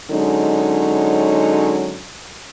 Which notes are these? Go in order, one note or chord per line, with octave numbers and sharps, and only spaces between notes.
D3 F#3 G#3 C#4 D#4